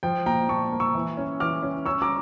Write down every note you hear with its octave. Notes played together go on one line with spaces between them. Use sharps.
F3 G5
A#2 G5 A#5
A#2 A5 C#6
A#3
C#6 E6
E3
C#4
E3 D6 F6
C#4
C#4 C#6 E6
A#5 D6